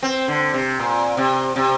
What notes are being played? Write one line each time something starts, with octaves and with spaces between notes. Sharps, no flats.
C4
D3
C3
A#2
C3
C3